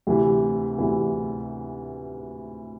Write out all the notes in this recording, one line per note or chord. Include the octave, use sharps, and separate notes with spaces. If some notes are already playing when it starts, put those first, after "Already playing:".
D2 C3 E3
D2 C3 E3